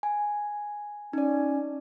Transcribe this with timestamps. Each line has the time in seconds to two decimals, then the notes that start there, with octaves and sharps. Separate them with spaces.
0.03 G#5
1.13 C#4 D#4 D5